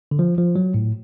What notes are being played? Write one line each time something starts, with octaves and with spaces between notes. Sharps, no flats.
D3
F3
F3
F#3
A2